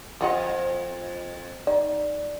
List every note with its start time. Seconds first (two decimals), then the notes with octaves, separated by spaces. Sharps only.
0.21 F2 F3 F4 D#5 F#5
1.67 D#4 D5